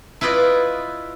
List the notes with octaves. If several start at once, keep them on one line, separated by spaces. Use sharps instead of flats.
E4 F4 B4 D5 D#5